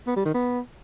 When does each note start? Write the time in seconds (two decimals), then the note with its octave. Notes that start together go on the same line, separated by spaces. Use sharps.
0.07 B3
0.16 G3
0.25 D#3
0.34 B3